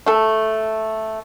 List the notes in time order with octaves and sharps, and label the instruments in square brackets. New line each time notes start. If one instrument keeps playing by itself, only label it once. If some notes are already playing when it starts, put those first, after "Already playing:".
[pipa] A3 A4